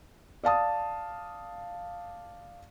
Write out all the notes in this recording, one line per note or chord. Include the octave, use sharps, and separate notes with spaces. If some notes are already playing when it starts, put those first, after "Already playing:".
D5 F5 A5 D#6